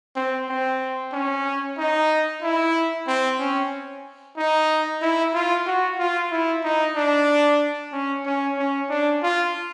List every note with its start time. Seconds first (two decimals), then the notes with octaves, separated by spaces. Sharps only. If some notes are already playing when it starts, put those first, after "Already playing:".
0.16 C4
0.49 C4
1.13 C#4
1.78 D#4
2.43 E4
3.07 C4
3.39 C#4
4.37 D#4
5.02 E4
5.34 F4
5.66 F#4
5.99 F4
6.31 E4
6.64 D#4
6.95 D4
7.92 C#4
8.26 C#4
8.58 C#4
8.90 D4
9.23 F4